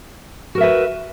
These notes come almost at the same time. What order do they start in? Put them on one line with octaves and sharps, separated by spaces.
F#4 A#4 E5 B4